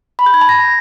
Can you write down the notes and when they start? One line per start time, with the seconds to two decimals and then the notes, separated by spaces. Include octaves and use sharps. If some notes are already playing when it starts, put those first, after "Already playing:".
0.19 B5
0.26 G6
0.34 G#6
0.41 A5
0.49 A#6